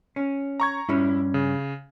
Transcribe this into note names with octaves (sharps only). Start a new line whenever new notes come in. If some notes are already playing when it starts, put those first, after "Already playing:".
C#4
A#5 C#6 G#6
G2 G3 C#4 E4
C#3